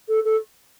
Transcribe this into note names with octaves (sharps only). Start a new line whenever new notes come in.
A4
A4